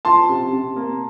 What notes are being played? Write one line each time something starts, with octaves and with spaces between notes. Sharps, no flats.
F3 A5 C6
C3
C3
A#3